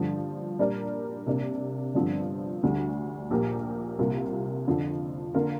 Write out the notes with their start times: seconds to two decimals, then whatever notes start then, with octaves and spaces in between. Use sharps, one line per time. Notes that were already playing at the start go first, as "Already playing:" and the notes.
Already playing: G2 D3 F3
0.59 A#2 G3 D4 A#4 D5
1.27 C3 A#3 D4
1.94 G1 G2 D3 F3 C4
2.63 D2 D3 G3
3.31 A#1 A#2 A#3 G4 A#4
3.99 C2 C3 A#3 F4
4.67 F2 D3 F3
5.34 D3 A#3 F4 A#4